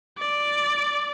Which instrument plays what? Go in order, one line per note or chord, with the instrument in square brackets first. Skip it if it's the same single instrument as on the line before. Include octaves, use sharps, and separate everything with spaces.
[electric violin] D5